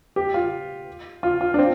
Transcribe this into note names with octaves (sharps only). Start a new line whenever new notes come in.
G4
F4
F4
F4
D4
C4